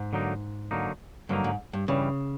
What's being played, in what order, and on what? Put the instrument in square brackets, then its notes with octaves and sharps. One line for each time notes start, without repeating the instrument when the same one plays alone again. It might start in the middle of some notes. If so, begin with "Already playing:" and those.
Already playing: [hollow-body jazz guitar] G#2
[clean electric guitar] D3 F#3 A#3 D#4
D3 F#3 A#3 D#4
[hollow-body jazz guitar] G2 [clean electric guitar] D3 F#3 A#3 D#4
[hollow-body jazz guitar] G#2
G2
[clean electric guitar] G2 E3 G3 [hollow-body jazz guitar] C#3